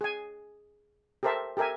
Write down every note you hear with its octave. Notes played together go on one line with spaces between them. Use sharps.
G#4 G#5
G4 A4 A#4 C5 E5 A5
G4 A4 A#4 E5 G#5